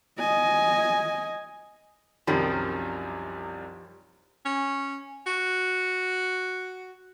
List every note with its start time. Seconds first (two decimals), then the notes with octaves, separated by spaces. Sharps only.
0.19 D#5 G#5
2.27 C2 F#2 C3 D#3 F3 G3
4.46 C#4
5.27 F#4